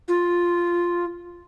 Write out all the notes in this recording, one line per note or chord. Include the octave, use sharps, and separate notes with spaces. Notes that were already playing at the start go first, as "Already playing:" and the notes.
F4